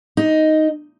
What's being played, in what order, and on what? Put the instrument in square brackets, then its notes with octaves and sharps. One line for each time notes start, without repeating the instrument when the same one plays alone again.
[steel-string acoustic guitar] D#4